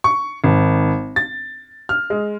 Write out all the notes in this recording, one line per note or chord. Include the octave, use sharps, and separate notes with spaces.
C#6
G#1
A6
F6
G#3